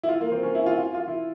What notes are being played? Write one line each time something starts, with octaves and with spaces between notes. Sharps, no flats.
E4
F4
A#3
C4
C#4
E4
F4
F4
F4
E4